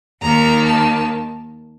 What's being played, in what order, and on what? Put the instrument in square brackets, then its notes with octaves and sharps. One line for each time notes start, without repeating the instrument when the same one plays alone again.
[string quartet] D#2 D#3 A#3 A#5
A5